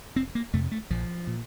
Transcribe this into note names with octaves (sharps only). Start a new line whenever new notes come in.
F1 C4
A#3
F2 C3 A3
A3
A#1 F3
A#2